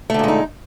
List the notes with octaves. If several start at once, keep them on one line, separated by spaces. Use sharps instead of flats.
A#2 D3 G#3 A3 D#4